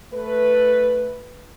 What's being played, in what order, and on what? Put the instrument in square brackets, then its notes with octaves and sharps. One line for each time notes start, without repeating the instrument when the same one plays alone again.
[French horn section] A3 B4